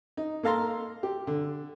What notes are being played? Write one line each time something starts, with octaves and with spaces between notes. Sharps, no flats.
D#4
A#3 A4 F5 A#5 C6
G4
D3